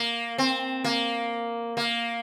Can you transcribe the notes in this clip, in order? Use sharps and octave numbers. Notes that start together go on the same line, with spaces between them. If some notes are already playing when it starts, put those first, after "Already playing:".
Already playing: A#3
C4
A#3
A#3